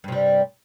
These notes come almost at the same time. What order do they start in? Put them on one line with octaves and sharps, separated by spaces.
G2 C3 G3